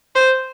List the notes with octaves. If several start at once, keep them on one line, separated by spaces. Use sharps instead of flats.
C5